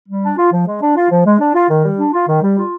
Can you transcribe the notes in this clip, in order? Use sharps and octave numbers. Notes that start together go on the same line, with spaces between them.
G3
D4
F4
F3
G#3
D4
F4
F3
G#3
D4
F4
D#3
G3
D4
F4
D#3
G3
F4